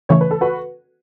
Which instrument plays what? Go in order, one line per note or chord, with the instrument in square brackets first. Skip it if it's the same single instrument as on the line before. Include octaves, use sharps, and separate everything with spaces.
[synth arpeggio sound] C#3 E3 A3 [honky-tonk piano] C#5
[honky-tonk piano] B4
A4
F#4 B4